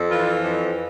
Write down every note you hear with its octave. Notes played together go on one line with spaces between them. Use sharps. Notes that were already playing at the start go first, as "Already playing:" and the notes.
Already playing: F2
E3 F4
F2